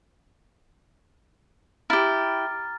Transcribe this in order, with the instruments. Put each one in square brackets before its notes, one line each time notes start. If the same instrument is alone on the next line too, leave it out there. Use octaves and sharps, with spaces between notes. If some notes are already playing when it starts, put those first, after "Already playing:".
[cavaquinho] E4 G4 [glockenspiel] A#5 F6 A6